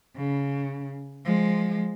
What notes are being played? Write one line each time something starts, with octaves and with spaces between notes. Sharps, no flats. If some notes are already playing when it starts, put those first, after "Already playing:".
C#3
F3 G#3